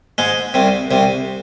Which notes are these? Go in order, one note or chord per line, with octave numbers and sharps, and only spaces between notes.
G#2 G#3
C2 C3
C2 C3